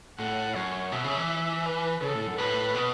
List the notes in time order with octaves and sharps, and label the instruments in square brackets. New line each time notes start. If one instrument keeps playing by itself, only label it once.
[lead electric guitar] A2 [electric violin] F#5
[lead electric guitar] F#2 [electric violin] C#5
[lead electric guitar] B2 [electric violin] E5
[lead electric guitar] C#3
E3
[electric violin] B4
[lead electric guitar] C#3 [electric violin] A4
[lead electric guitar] A2
F#2
[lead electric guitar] A2 [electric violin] B4
[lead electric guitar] B2